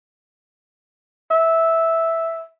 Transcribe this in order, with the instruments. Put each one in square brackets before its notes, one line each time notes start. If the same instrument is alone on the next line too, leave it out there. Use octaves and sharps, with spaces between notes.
[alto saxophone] E5